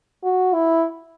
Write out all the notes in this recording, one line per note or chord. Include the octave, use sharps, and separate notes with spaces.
F#4
E4